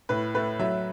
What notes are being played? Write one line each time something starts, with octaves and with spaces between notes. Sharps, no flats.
A2 B4
A3 B4
F#3 E5